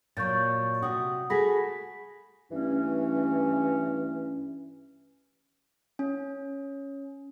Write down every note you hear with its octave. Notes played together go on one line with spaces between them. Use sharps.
A#2 F#3 C#6 G6 A6
C3 F#4 D#6
A3 F#4 G#4 B5 A#6 B6
G2 E3 A3 C#4
C#4